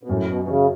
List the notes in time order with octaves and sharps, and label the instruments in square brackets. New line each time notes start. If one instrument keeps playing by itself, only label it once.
[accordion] B2
[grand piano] F#2 [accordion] A2
[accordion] B2
B2
[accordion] C#3 [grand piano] F#3